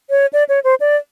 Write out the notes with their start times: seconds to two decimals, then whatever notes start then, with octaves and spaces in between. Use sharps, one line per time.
0.10 C#5
0.33 D5
0.49 C#5
0.64 C5
0.80 D5